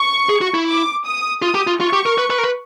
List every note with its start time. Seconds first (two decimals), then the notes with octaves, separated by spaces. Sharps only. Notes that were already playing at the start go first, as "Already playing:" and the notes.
Already playing: C#6
0.29 G#4
0.41 F#4
0.54 E4
0.67 D6
1.05 D#6
1.42 F4 D#6
1.55 G4
1.67 F4
1.80 F4 C#6
1.93 G4
2.06 A#4
2.18 B4
2.30 B4
2.38 A#4
2.44 B4